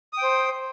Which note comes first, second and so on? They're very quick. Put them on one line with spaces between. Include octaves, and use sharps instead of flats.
D#6 G5 C5